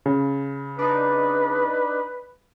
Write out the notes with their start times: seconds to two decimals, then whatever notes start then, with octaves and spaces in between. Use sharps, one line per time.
0.06 C#3
0.79 D4 D#4 B4